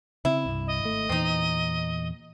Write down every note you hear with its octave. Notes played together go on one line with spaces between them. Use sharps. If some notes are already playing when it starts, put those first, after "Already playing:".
C#3 C4 E4
C2 G2
D#5
G#1 A3
E2 A#2 E3 C4 D#4